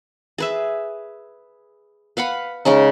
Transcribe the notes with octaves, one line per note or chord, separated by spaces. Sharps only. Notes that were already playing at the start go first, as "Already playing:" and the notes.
G#4 B4 E5
B4 F5 F#5 B5
C#3 G#3 C#4 D#4